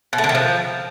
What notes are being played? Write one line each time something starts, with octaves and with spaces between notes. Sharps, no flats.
B2
A3
D3
D#3
F3